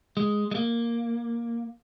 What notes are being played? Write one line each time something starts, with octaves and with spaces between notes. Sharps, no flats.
G#3
G#3
A#3